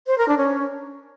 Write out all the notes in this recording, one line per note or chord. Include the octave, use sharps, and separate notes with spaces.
C5
A#4
D4
C#4